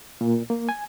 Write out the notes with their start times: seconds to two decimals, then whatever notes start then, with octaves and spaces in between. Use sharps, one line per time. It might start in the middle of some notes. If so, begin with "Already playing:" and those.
0.21 A#2
0.50 A#3
0.69 G#5